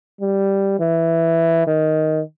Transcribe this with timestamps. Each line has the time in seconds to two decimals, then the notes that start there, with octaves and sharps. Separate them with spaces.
0.21 G3
0.79 E3
1.67 D#3